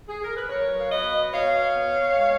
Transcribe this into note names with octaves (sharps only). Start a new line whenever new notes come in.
G#4
A#4
B4
F#3 A#4 C#5
F5
B2 B4 D#5
B2 C#5 F5
B3
G#3